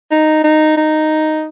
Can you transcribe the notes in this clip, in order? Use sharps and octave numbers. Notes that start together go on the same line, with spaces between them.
D#4
D#4
D#4